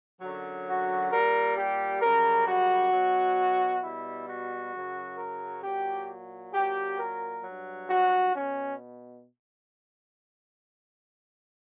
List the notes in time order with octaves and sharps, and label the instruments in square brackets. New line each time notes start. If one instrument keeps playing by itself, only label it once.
[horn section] F#2 D3 F#3
F#4
A#2 G3 A#4
G4
F#2 C#3 G3 A#4
F#4
B2 F#3
B2 G3 E4
F#4
F#2 C#3 F#3
A#4
A#2 F#3 G4
A#2 F#3 G4
A#4
G2 F#3
F#4
B2 C#4